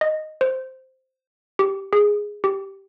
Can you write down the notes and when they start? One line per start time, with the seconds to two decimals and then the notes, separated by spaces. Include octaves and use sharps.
0.01 D#5
0.41 C5
1.59 G4
1.93 G#4
2.44 G4